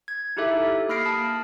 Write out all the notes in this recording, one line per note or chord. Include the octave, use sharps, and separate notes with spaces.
G#6
D#4 E4 G4 A4 E5
A#3 B5 F6 A#6 C7 D7
A5 B5 D#6